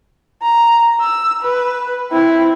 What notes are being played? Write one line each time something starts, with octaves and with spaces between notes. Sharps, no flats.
A#5
E6
B4
C4 E4